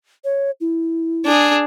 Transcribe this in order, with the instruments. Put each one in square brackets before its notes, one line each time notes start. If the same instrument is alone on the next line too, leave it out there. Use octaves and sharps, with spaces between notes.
[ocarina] C#5
E4
[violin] D4 G#4